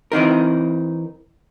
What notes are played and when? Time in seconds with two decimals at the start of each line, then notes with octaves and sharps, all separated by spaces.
0.12 E3 C4 D#4 A#4